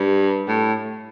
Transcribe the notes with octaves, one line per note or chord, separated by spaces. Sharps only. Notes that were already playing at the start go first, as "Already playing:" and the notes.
Already playing: G2
A2